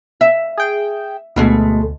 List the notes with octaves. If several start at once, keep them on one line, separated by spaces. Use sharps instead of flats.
E5
G#4 G5
D2 B2 G#3 A3